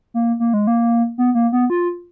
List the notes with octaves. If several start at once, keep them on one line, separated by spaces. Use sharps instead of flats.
A#3
A#3
G#3
A#3
B3
A#3
B3
F4